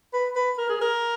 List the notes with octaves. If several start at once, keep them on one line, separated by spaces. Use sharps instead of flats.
B4
B4
A#4
G#4
A#4